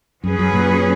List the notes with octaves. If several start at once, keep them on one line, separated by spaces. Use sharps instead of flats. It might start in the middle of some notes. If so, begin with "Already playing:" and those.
F#2 F#3 C#4 G#4 B4
F#2
F#2 A#2